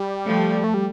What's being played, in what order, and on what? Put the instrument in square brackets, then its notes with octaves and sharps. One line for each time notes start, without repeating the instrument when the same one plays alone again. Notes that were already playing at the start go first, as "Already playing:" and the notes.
Already playing: [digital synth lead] G3
[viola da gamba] F3 A3
[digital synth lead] A3
G3